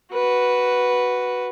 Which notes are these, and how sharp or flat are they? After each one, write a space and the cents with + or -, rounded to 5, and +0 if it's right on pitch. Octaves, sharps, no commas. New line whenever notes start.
F#4 +0 B4 -5